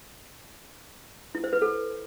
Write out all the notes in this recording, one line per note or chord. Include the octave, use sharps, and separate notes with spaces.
E4
C5
B4
A4